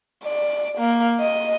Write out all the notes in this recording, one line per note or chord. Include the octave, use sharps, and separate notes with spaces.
D5
A#3
D#5